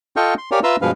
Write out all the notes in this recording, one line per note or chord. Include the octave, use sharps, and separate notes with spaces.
F4 A4 D#5 F5 G5 C#6
C6
G4 A#4 C#5 D5 F5 G#5
F4 B4 E5 A#5 C6 E6
G2 B2 F3 G#3 B4 F5